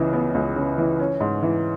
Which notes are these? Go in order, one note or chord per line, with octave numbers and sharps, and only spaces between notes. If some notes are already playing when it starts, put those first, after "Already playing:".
Already playing: C#2 C#3 E3
B3
C#2
C#3
E3
C#4
G#2
E3